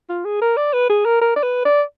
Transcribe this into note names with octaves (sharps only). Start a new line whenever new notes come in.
F4
G#4
A#4
D5
B4
G#4
A#4
A#4
D5
B4
D5